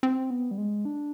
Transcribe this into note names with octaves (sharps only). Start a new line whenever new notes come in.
C4
B3
G3
G#3
D4